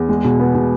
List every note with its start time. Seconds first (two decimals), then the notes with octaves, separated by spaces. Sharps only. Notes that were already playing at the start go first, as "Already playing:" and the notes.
Already playing: E2
0.09 G#3
0.24 B2
0.39 B3
0.55 B2